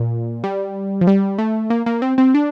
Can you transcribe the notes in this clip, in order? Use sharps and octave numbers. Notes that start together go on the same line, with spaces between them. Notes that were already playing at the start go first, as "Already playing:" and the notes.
Already playing: A#2
G3
F3
G3
A3
A#3
A#3
C4
C4
D4